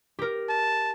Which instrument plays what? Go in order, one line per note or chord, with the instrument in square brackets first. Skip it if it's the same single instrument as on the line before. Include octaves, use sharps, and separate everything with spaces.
[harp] G4 A#4
[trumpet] A5